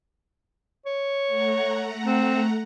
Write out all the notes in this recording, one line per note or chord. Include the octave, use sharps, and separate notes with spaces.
C#5
A3 F#5 A#5
C4